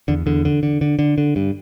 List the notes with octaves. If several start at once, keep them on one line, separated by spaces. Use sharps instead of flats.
E2 D3
E2 D3
D3
D3
D3
D3
D3
G2